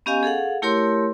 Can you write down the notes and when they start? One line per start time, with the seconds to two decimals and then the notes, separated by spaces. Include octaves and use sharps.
0.06 B3 C#4 G4 D#5 F5 G#5
0.23 G#4 A4 F5 F#5
0.62 A3 E4 G4 A#4 C#5 C6